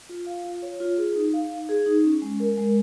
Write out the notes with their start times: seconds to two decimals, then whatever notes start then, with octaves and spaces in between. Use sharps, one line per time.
0.09 F4
0.27 F5
0.45 F4
0.62 C#5
0.80 F4
0.98 G#4
1.15 D#4
1.34 F5
1.51 D#4
1.69 G#4
1.86 D#4
2.04 C#4
2.22 G#3
2.40 A#4
2.58 G#3